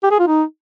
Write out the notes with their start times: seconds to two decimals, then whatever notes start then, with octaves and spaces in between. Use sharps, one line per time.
0.03 G4
0.11 G#4
0.19 F4
0.27 D#4